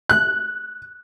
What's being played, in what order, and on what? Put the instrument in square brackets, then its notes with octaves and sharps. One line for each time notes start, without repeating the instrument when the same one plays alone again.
[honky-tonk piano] F#6